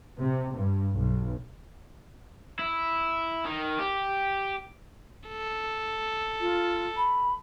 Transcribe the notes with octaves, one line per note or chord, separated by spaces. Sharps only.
C3
G2
B1
E4
D#3
G4
A4
F4
B5